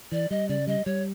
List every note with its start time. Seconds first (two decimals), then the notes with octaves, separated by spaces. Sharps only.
0.12 E3 D5
0.31 G3 D#5
0.49 C#3 D5
0.67 G3 D#5
0.86 G3 C#5